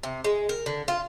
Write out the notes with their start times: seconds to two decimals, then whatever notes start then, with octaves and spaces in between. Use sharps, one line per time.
0.03 C3
0.24 G#3
0.49 A#4
0.66 D3
0.88 F4